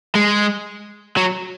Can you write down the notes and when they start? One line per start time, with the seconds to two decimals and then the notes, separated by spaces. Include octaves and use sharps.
0.15 G#3
1.17 F#3